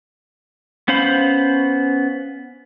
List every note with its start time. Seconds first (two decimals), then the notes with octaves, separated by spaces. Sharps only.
0.88 B3 C#4 C5 F5 B5